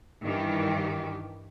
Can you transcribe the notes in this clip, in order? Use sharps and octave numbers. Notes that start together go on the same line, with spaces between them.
G2 D#3 E3 G4